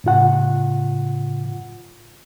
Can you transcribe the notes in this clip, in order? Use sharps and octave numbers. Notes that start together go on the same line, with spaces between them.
A2 C#3 F4 F#5